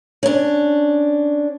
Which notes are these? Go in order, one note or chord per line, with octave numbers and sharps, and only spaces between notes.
C#4 D4